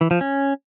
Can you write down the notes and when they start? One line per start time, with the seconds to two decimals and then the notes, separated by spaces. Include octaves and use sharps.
0.01 E3
0.11 F3
0.21 C#4